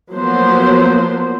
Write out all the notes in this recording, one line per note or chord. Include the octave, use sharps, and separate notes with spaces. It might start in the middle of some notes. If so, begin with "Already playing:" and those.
F3 F#3 A#3 B3 C5